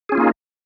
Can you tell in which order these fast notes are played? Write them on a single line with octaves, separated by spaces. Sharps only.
G#4 C#4 F4 A#3 D#4